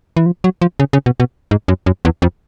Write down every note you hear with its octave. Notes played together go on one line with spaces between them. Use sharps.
E3
F3
F#3
F3
C#3
C#3
B2
B2
G#2
F#2
F#2
E2
F2